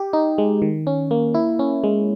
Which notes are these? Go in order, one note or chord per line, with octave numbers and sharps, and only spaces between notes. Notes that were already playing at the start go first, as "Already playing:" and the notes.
Already playing: G4
D#4
G#3
D#3
C#4
A#3
E4
C#4
G#3